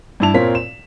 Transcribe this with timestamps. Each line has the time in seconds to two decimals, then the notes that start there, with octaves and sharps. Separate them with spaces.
0.20 G2 D4 E4 A5 F7
0.34 A#2 C4 F4 A#4 C#5 B6
0.55 E7